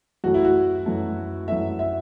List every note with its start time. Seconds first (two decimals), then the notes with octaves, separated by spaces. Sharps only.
0.24 F#2 E3 A3 F#4
0.34 E4
0.45 F#4
0.86 F#2 E3 A3
1.48 F#2 E3 A3 E5
1.79 E5